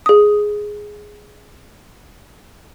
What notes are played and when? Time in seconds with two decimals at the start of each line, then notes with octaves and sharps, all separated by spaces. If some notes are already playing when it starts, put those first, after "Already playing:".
0.06 G#4 D#6